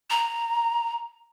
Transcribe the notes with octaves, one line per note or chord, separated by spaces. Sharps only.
A#5